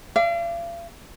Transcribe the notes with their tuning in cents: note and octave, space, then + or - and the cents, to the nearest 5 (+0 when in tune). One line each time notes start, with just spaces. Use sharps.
D5 +0 F5 -40